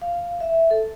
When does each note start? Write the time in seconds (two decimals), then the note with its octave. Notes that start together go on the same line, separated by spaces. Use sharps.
0.02 F5
0.40 E5
0.71 A4